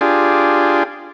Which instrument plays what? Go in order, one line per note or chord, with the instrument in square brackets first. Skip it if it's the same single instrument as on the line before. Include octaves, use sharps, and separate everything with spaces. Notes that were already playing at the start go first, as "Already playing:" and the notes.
[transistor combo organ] D4 F4 G4 G#4